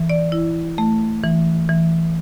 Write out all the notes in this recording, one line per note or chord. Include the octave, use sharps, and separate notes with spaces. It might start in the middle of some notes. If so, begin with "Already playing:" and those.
Already playing: E3
D5
E4
A3
E3
E3